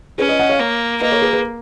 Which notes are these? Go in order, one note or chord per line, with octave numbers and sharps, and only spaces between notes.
C#4 G#4 B4
B4 D#5
D#5 F#5
C#5 F5
A#3
A#3 B4 D#5
A#4 C#5
G#4 B4
G#4 B4